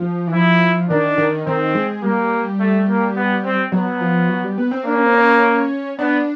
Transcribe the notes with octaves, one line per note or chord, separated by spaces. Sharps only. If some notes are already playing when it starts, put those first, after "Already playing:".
Already playing: F3
E3
F3 E4
D#3 D4
D#3
D#3 C4
G#3
G3 A#3
A3
A#3
B3
C4
F#3 B3
F3
F#3
G3
B3
C4
A#3 D4
C#4
C4
C#4
B3 D4